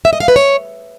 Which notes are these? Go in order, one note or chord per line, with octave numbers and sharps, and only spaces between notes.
E5
D#5
F5
B4
C#5